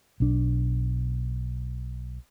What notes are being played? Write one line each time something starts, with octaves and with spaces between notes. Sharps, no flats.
B1 D4